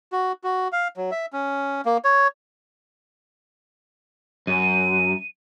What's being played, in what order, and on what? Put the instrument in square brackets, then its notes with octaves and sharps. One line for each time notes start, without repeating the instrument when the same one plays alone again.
[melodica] F#4
F#4
F5
F#3
E5
C#4
A#3
C#5
[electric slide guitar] F#2 [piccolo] D#7